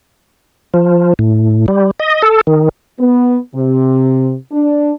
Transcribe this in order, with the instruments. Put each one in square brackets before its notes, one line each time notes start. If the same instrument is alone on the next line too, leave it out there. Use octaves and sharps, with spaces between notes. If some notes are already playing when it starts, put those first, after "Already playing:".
[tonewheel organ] F3
A2
G3
D#5
A4
D#3
[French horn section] B3
C3
D4